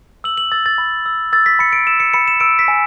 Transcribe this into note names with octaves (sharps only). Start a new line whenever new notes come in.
E6 F#7
F#7
E6 A6
A6
B5
E6
E6 A6
B6
B5 C#7
D7
E6 E7
C#7
B5 C#7
E7
E6 D7
B6
G#5